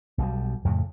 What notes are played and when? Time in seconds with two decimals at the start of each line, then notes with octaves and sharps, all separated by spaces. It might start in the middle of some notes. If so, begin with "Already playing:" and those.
0.18 B1 B2 D#3 G3
0.65 F2 A2 C#3